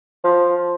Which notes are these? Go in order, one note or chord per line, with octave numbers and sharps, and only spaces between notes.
F3